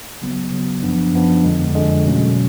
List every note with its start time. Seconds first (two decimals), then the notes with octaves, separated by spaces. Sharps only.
0.22 C#3 F#3 B3
0.52 C#3 F#3 B3
0.83 F#2 F3 B3 D4
1.13 F#2 F3 B3 D4
1.44 F2 D3 G#3
1.75 F2 D3 G#3
2.05 B2 F#3 A3 C#4